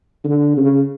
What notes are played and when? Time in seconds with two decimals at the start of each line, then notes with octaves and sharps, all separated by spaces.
0.24 D3
0.57 C#3